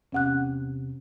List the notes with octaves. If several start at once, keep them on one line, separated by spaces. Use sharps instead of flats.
E2 C3 C#4 F#5 F#6